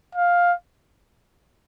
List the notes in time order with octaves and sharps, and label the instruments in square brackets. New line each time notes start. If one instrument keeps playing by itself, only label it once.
[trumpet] F5